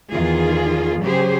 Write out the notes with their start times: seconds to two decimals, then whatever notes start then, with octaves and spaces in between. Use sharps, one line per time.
0.10 E2 D#3 F4 G#4
1.02 C#3 F#3 G4 G#4 C5